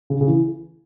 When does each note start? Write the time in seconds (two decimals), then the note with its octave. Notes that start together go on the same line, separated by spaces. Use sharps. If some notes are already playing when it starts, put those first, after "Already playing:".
0.10 C#3
0.21 C#3
0.27 E3